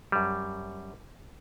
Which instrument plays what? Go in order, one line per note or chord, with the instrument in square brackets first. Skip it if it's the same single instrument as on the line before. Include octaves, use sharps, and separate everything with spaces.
[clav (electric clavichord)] F#2 G3